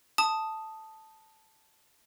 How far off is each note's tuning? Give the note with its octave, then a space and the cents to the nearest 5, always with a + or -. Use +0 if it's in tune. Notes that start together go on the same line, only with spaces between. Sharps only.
A5 +0 D#6 +0